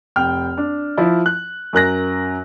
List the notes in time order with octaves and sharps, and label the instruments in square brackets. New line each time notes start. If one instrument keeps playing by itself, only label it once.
[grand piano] F1 G5 F6
D4
F3 E4
F#6
F#2 A#4 F#6 A#6